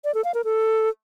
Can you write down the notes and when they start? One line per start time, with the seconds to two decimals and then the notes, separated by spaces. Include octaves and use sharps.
0.04 D5
0.14 A4
0.24 F5
0.34 A#4
0.44 A4